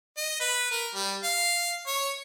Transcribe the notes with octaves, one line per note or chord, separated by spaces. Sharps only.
D#5
B4
A#4
G3
F5
C#5